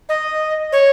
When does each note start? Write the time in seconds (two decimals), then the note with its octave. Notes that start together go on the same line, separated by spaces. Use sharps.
0.09 D#5
0.72 C#5